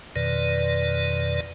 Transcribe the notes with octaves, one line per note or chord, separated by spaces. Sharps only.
F2 B2 D#3 B4 D5